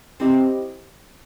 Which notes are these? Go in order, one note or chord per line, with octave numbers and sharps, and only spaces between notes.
C4 E4 G4 C5 D#5 G5